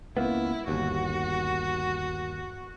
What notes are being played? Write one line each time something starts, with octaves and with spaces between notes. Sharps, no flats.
C#2 A#3 B3 E4
G1 D#2 F#4